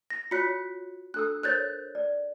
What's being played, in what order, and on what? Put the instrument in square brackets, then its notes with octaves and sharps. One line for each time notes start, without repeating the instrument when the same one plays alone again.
[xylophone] A#6
[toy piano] F4 F#4 C#5 [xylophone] F#6 B6 C#7
[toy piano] D4 A4 E6 [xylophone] F#6
[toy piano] A#4 C5 C#5 [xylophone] F#6 G6 A6
[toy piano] D5